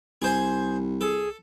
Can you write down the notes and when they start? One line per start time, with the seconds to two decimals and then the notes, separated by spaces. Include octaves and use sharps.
0.22 C2 G#4 C5 G#5
1.01 G#4 A4